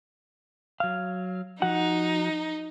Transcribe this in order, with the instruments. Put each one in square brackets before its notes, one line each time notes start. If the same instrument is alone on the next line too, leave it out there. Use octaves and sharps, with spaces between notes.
[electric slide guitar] F#3 F5
[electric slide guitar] F3 F#4 F#5 [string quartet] D#4